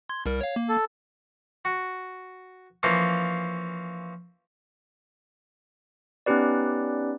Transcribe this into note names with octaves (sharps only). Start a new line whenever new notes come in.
C6 G#6
C2 G3 A#4
C#5 F5
A#3
A4
F#4
E3 F3 A#3 C#4
B3 C#4 D#4 G4 B4 D5